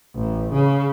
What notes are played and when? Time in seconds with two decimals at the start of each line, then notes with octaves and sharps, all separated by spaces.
0.15 A1
0.52 C#3